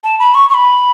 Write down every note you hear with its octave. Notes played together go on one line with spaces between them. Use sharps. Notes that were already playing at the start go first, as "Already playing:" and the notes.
A5
B5
C#6
C#6
B5